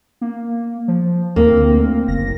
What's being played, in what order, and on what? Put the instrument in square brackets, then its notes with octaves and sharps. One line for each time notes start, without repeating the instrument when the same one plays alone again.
[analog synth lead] A#3
F3
[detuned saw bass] D#2 [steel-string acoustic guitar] A#3 [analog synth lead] C4
[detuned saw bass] D2
[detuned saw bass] F#1 [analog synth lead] A#6